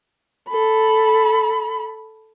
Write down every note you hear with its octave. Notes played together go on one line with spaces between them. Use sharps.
A4 B5